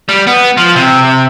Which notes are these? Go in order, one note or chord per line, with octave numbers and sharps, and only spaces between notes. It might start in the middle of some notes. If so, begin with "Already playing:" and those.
G3
B3
F3
C3